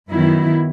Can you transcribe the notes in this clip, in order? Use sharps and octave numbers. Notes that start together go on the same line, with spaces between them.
F#2 D#3 F#3 B3 E4